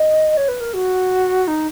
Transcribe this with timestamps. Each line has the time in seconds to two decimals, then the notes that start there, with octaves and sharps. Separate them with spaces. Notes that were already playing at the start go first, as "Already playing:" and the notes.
Already playing: D#5
0.37 C#5
0.48 B4
0.61 A#4
0.74 F#4
1.48 D#4